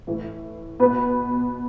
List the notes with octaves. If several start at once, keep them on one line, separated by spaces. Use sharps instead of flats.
A2 E3
B2 B3 B4